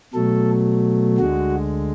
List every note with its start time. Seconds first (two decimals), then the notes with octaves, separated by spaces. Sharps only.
0.14 B2 F#3 A3 A4
1.18 D2 D3 G#3 F#4